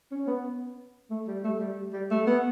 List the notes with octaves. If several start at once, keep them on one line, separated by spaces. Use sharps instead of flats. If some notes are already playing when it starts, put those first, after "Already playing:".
C#4
B3
A3
G3
A3
G3
G3
A3
B3